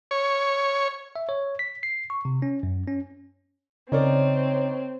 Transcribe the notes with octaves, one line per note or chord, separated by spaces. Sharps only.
C#5
E5
C#5
B6
C7
C#6
C3
C#4
F#2
C#4
C#3 C4 D#4 A#4 C#5 D5